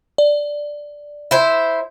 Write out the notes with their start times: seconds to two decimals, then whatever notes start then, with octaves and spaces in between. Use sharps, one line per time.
0.18 D5
1.31 E4 C5